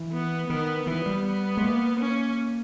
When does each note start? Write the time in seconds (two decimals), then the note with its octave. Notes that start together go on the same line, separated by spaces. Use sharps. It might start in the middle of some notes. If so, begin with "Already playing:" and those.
Already playing: E3
0.13 B3
0.49 D#3 B3
0.87 E3 B3
1.06 G3
1.24 B3
1.57 G#3
1.62 A#3
1.99 C#4